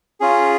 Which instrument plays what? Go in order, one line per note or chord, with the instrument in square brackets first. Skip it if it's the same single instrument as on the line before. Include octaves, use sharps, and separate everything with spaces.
[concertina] C#4 F4 G#4